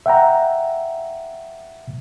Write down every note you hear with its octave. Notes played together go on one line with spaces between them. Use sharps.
E5 F#5 G5 A#5